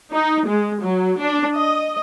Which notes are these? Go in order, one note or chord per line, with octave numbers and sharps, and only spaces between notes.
D#4
G#3
F#3
D4
D#5